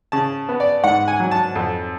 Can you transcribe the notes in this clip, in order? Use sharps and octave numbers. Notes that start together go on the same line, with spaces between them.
C#3 A5
B3
D5
G#2 F#5
G#5
F#3
A5
F2